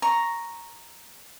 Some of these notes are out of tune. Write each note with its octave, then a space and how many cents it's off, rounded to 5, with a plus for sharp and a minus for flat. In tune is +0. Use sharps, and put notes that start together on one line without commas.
A#5 +0 C#6 -5